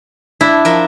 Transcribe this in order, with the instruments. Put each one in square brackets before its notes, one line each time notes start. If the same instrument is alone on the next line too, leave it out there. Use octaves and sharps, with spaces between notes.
[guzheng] D4 [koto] E4
[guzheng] F3 A#4 E5